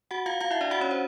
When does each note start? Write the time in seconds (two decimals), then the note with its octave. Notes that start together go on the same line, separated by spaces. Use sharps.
0.11 F#4 F#5
0.26 F4 F5
0.40 F4 F5
0.51 E4 E5
0.61 D4 D5
0.71 F#4 F#5
0.81 C#4 C#5
0.91 C5